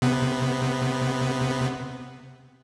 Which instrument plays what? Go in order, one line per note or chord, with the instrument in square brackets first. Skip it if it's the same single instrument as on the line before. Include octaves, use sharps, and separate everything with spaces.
[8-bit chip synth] C3 B3